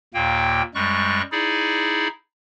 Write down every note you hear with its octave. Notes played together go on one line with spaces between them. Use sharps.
D#2 A#2 A#3 G5
F#2 G3 G#3 C#6 F#6
D#4 E4 G#4 D5